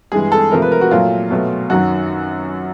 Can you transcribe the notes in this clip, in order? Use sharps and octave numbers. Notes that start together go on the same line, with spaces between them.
G2 E3 G#3 G#4
A4
C3 F3 A3 A#4
B4
A#4
F#4
A#2 F#3 A3 F4
B2 F#3 A3
F#2 D#3 F#3 F#4